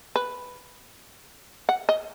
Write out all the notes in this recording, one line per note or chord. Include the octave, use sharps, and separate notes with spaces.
B4
F#5
D#5